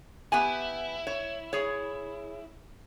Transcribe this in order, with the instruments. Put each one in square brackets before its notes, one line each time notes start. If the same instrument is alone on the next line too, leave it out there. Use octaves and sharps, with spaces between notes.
[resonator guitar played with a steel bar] B3 G4 G#5 [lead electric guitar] E4
[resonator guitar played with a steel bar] C#5
G#4 C#5